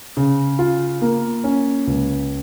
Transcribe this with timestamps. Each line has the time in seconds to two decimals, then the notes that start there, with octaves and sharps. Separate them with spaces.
0.17 C#3
0.59 F4
1.02 A#3
1.44 C#4
1.87 C#2